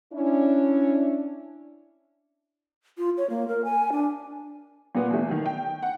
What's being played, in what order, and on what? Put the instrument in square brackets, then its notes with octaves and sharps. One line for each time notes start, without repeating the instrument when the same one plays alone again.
[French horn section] C#4 D4 E4
[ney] F4
C#5
A#3
A#4
G#5
D4
[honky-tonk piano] A#2 B3
E2 A3
D#3
G5
F#5